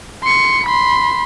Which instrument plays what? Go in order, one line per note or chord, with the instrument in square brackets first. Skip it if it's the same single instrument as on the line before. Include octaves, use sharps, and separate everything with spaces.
[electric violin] C6 C#7
B5 C6